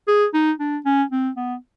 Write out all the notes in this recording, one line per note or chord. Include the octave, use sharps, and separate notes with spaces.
G#4
D#4
D4
C#4
C4
B3